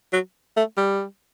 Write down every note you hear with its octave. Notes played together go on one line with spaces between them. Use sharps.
F#3
A3
G3